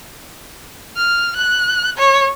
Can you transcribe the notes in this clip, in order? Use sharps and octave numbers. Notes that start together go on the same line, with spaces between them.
F6
F#6
C#5